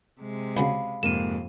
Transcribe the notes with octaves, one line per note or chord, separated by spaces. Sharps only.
C3 G#3
C#2 C#3 F#3 F5 B5
F2 G#2 C3 A#3 D#7 E7